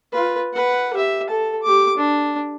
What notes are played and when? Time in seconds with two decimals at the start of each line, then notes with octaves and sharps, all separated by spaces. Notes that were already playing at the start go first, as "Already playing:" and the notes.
0.12 F4 B4
0.53 B4 F#5
0.94 G4 E5
1.29 A4 A5
1.63 G4 D6
1.97 D4